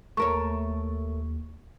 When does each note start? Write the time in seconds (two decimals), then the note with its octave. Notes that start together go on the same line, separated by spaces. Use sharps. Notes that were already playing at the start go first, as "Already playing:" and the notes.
0.17 D#2 A3 A#4 C#5 C#6